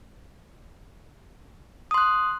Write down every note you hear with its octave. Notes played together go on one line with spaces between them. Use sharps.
C6 D#6 F#6